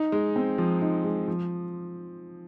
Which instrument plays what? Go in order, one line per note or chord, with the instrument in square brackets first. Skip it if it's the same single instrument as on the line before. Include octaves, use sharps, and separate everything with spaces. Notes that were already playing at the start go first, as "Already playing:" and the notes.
Already playing: [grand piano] D#4
G#3
C4
F3
D#4
G#3
F3